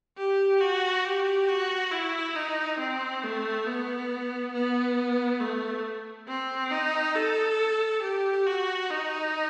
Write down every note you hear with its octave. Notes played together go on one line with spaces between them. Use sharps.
G4
F#4
G4
F#4
E4
D#4
C4
A3
B3
B3
A3
C4
D#4
A4
G4
F#4
D#4